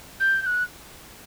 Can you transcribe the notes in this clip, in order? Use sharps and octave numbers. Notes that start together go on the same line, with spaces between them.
G6
G6
F#6